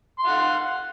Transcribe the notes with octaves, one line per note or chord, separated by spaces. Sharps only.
F5 F#5 C6